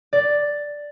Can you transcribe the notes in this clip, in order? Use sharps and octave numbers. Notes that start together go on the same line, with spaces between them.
D5